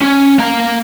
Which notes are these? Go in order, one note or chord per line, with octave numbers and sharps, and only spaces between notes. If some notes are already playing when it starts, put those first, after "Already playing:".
C#4
A#3 A#5